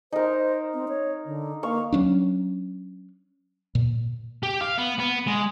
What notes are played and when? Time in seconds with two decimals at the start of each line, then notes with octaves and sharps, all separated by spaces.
0.12 D#4 A#4 C5
0.74 C4
0.88 C#5
1.26 D3
1.63 A#3 F5 C#6
1.93 F#3 C#4 D4
3.75 A#2
4.43 G4
4.61 F5
4.78 B3
5.00 B3
5.27 G#3